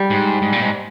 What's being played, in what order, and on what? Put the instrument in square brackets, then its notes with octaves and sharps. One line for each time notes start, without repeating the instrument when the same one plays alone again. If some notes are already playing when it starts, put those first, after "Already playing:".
Already playing: [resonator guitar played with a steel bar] G3
[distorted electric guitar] G#2
G#2
A#2
G#2